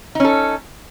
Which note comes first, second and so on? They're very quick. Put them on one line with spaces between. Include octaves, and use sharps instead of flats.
D#4 C#4 A4